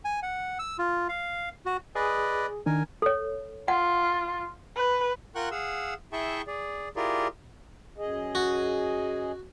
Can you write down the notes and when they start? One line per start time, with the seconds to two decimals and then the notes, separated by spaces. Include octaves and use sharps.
0.05 G#5
0.22 F#5
0.59 E6
0.79 F4
1.09 F5
1.66 F#4
1.95 G#4 B4 D5 D#5
2.66 D#3 D4 A#4 G#5
3.02 A4 C#5
3.68 F4 F#5
4.76 B4
5.35 F4 A#4 F#5 G5 C#6 F#6
5.51 G#4 F5 F#5 E6
6.13 E4 G#4 E5 G5 A5 C#6
6.47 G#4 D5
6.96 E4 F4 G4 G#4 A#4 D5
7.98 F#2 G#4 D#5
8.35 F#4